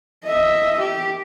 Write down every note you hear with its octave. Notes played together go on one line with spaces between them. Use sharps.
D#5 E5
G4